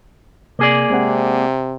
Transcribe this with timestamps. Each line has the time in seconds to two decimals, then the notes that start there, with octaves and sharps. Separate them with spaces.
0.59 C3 A#3 G#4 D5
0.90 C3 G#3 C4 F#5